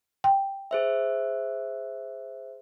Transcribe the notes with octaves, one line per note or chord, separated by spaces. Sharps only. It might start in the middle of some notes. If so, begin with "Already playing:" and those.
G5
G#4 C5 E5